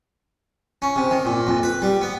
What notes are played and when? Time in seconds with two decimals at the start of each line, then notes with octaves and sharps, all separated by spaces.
0.82 C#4
0.96 C3
1.11 D#3
1.25 A#2
1.47 F2
1.63 B4
1.82 G3
2.01 B3